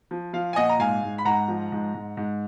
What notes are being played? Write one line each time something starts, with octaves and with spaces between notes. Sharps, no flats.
F3
F3 F5
G#5
A#2 D#5 F#5
A#5
G#2 F5 G#5
G#2
B5
G#2 F#5 A#5
F3
G#2
G#2
G#2